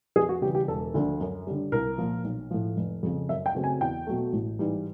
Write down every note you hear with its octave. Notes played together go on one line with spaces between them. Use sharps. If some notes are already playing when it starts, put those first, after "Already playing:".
F2 G#4
F#4
C#3 E3 G3 G4
G4
E1 A4
D2 D3 F3
F#2
D3 G3
C2 A#4
A#2 F3
B1
A2 F3
F1
F2 C#3
F#2 E5
G5
C#3 F#3 A3 C4
G#5
E2 G5
B2 F#3 A3
A1
G#2 E3 G3